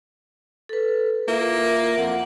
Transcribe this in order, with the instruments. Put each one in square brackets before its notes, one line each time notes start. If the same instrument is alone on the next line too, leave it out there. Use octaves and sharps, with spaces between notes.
[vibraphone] A4 B4
[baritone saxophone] A#3 [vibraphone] E4 F4 E5
[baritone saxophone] F2 [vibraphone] F#5